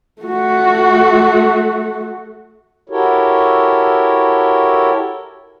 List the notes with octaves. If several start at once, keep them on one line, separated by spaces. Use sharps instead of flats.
A3 F#4
E4 F#4 G4 A4 A#4 C#5